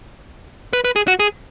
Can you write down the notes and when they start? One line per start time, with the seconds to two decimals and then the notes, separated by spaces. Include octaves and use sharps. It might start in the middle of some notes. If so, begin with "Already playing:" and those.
0.73 B4
0.84 B4
0.96 G#4
1.08 F#4
1.19 G#4